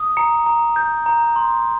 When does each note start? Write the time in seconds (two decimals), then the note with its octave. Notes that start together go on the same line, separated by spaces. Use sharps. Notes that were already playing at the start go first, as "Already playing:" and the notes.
Already playing: D#6
0.17 A#5 C#7
0.46 A#5
0.76 G6
1.06 A#5
1.36 C6